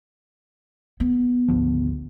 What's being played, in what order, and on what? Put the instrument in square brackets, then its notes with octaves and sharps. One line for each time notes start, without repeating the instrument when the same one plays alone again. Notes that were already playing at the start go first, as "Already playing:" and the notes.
[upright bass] B3
[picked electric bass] G#1 D2 F3